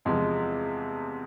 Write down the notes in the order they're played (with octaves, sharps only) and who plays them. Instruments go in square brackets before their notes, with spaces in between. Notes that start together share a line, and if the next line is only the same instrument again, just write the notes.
[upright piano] E2 C3 F3 G#3